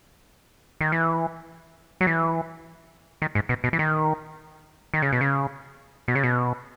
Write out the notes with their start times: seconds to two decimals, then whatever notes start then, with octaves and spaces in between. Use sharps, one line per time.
0.81 D#3
0.92 E3
2.01 F#3
2.07 E3
3.22 D#3
3.35 G#2
3.49 B2
3.64 B2
3.73 E3
3.79 D#3
4.94 D#3
5.02 C#3
5.13 B2
5.21 C#3
6.08 B2
6.15 C#3
6.23 B2